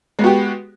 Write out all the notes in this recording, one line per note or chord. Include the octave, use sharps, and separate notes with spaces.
G#3 B3 F#4 G4